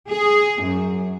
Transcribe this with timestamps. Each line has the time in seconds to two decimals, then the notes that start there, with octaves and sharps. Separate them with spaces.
0.10 G#4
0.64 F#2